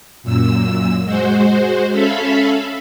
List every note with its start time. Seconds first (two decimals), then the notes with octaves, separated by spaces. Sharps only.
0.23 F#2 A#2 E6
1.03 G#3 F#4 C5
1.92 C#4 A4 E5 F5 B5